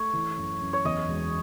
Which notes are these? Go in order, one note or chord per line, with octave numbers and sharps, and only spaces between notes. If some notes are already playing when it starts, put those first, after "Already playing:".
Already playing: A3 C#5
E3
F#2
F#2
C#5
E2 D#5
E1